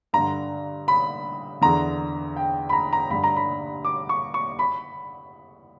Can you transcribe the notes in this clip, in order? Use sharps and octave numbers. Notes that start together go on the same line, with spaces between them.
G2 D3 A#5
B5
E2 D3 A#5
G5
B5
A#5
A#5
G2 D3 B5
A#5
B5
D6
C#6
C#6
B5